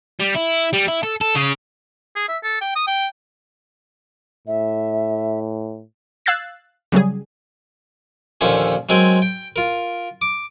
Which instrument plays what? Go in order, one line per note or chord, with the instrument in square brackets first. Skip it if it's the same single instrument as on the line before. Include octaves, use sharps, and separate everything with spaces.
[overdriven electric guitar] G3
E4
G3
E4
A4
A4
C#3
[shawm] G#4
E5
A4
G5
D#6
G5
[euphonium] A2 [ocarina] E5
[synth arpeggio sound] F5 E6 F#6 G#6 A6 C7
C#3 F#3 G3 G#4
[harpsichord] D#2 A#2 D3 F3 C#4
F#3 G#3 C4 A#4 G#5
G5
F4 A#4
D6